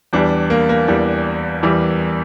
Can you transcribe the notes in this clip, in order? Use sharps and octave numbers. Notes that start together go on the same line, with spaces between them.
E2 E3 G3 D4
A#3
A#3
E2 E3 G3
E2 E3 G3